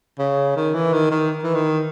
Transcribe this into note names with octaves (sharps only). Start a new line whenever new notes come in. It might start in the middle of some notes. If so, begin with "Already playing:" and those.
C#3
D#3
E3
D#3
D#3
E3
D#3